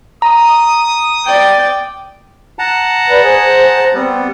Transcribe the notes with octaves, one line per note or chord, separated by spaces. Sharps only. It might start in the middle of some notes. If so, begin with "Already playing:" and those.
A#5 D#6
D5 G5
F#5 A5 A#5
B4 D5
G#4 C5
G#4
G3 B3 C4